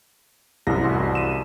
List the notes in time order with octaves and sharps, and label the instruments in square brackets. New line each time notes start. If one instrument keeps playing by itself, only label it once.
[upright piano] C2 [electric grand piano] F#2 A#6
[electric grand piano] A1 F#4 C6
D#7 E7